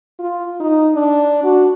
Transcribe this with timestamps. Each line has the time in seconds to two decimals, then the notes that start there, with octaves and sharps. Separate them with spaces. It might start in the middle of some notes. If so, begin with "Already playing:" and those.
0.19 F4
0.60 D#4
0.95 D4
1.44 F#4